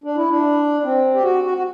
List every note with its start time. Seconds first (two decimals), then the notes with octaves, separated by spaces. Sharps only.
0.04 D4
0.16 E4
0.28 D4
0.84 C4
1.14 G4
1.23 F#4
1.44 F#4
1.58 F#4